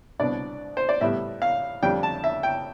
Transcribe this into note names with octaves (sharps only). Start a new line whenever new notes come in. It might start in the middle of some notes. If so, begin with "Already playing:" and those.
C2 B2 B3 D4 D5
C5
D5
A2 G3 B3 E5
F5
F2 D3 G3 D4 G5
A5
E5
G5